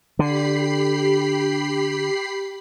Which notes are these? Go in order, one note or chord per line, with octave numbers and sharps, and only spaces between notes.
D3 G4 B5 C7